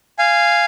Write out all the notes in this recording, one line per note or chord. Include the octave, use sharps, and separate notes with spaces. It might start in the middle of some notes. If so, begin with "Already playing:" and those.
F5 G#5